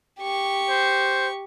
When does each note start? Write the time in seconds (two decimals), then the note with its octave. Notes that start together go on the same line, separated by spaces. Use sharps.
0.20 G4 C#6
0.69 C5